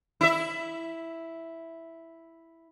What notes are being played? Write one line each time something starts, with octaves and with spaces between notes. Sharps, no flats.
E4 E5